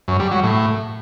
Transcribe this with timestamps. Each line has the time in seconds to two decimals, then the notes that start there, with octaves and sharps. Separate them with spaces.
0.08 F#2
0.20 G3
0.31 F#3
0.43 A2